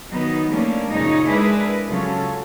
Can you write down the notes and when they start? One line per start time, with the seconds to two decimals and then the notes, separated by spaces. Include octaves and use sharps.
0.10 D#3 F#3 B3 D#4
0.48 G3 A3 A#3 C#4 D4
0.92 F#2 A#2 C#3 D#4 C#5
1.28 G#3 D4 E4 G#4 A#4 B4
1.89 C#3 F#3 C#4 F4 A4